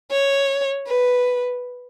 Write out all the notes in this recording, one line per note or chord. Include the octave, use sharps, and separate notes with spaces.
C#5
B4